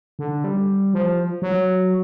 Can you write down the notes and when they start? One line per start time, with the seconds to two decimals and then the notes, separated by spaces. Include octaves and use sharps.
0.19 D3
0.44 G3
0.94 F3
1.42 F#3